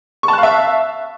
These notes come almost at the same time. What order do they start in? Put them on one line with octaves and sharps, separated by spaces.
C#6 A5 F#6 F5 E5